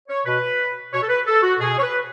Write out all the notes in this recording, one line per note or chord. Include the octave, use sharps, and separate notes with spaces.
C#5
B2 B4
B2 C#5
A4
B4
A4
F#4
B2 G#4
C#5
B4